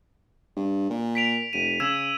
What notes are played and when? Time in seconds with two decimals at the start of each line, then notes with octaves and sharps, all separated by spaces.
0.57 G2
0.90 A#2
1.15 B6 D7 F7
1.53 F1 D#7
1.80 C#3 E6 G#6 E7